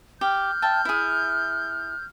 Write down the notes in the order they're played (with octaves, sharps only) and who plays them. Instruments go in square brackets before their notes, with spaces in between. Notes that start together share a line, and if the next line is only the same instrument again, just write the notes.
[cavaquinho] G4 [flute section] F6 G6
[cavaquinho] E5 G5 A5
E4 G#4